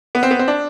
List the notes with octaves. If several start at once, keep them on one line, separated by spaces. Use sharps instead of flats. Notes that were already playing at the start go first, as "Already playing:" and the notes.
B3
C4
B3
C4
D4